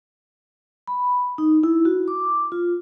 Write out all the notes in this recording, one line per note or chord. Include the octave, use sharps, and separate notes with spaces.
B5
D#4
E4
F#4
D6
F4